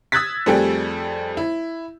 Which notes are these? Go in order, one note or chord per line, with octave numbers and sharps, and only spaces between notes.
D#6 E6 F#6 G#6 A6 B6
F2 G3 A3 G#4 G5
E4